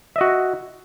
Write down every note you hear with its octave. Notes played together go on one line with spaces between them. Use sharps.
F#4 D#5 E5